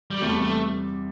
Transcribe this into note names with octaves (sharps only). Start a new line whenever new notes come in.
G3
E2 C3 G3 A3
A3